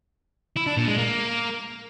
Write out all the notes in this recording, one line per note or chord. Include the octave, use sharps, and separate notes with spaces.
E4
D4
A#2
G#3
A#3